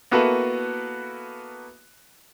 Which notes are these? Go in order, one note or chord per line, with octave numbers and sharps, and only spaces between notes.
A#3 B3 E4 F#4 A4 B4